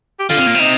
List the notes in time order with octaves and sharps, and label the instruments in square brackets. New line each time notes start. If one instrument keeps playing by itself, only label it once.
[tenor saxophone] G4
[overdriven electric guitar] D3 [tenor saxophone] F4
[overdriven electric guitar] C3
A#2
C3
[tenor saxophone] D#4